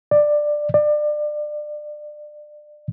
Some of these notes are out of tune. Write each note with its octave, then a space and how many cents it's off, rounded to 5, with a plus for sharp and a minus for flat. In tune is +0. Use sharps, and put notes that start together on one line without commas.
D5 +10
D5 +25